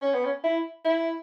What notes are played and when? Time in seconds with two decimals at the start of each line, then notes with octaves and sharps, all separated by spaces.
0.02 C#4
0.14 B3
0.24 C#4
0.44 E4
0.84 E4